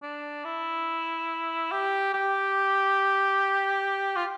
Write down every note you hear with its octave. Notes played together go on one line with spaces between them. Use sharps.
D4
E4
G4
G4
F4